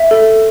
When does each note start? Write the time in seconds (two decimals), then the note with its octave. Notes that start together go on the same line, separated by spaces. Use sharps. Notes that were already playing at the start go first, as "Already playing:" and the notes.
Already playing: E5
0.11 A4